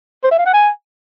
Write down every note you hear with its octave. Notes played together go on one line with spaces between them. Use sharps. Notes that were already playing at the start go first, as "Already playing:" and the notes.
C5
E5
F5
F#5
G#5